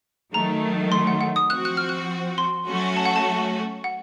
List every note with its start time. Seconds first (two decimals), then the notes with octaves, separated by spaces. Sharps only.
0.33 D#3 F#3 A3 A#5
0.92 C6
1.07 F#5
1.21 F#5
1.36 D#6
1.50 F3 C4 F#4 F#6
1.65 F#6
1.77 F6
1.89 F#6
2.38 C6
2.67 F#3 A3 C#4 F#4
2.97 A5
3.05 F#5
3.16 A5
3.84 F#5